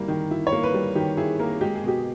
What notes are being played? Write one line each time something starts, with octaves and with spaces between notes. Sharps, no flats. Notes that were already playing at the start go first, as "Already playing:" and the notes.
Already playing: G3 A#3 E4
D#3
E4
C#5
A#3
B4
G3
D#3 G4
E4 G#4
A#3 A#4
G#3 G4
G#4
B2 G4